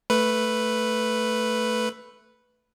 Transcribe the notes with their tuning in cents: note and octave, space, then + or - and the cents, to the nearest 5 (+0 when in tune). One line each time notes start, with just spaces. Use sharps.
A3 +5 B4 +0